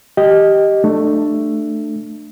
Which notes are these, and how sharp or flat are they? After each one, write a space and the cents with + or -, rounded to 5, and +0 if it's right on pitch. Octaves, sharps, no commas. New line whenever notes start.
G4 -5 D#5 +0
A3 +10 D4 +30